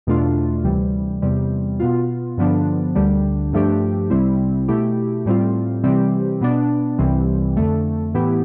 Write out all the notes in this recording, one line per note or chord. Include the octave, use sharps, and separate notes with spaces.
E2 B2 A3 D4 F4
D2 C3 E3 G3
E2 C3 G3
B2 B3 F4
G2 D3 F3 B3 D4
D2 D3 G3 D4
G2 F3 A3 D4 G4
C2 C3 G3 C4 E4
B2 A3 E4 G4
A2 G3 C4 F4
C3 E3 G3 C4 G4
B2 B3 D4
C2 C3 E3 G3 C4
F2 D3 A3
A2 E3 B3 E4 G4